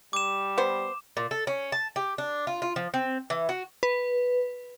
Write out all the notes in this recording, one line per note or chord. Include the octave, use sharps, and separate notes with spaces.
G3 D6 E7
B3 C5
A#2
A4
C#4
A5
G4
D4
F4
F4
F3
C4
E3
F#4
B4